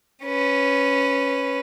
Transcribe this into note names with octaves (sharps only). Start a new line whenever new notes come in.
C#4 B4